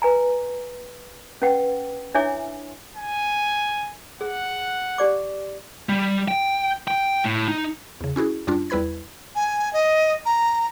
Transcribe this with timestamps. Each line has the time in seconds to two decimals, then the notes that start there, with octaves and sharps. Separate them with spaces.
0.02 B4 G#5 A#5
1.42 C#4 B4 F#5 G5
2.14 D4 E4 C#5 E5 G#5 D6
2.96 G#5
4.21 G#4 F#5
4.98 G4 D5 D6
5.89 G3
6.28 G5
6.88 G5
7.25 A2
7.48 D#4
8.01 E2 C#3
8.16 C#4 E4 F#4 G#4
8.47 F#2 G3 D4 F4
8.70 E2 G3 E4 B4 B5 G#6
9.35 G#5
9.73 D#5
10.26 A#5